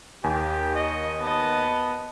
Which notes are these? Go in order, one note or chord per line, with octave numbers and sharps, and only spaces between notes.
D#2 G4 G#5
D#5 C#6
B3 D#5 A5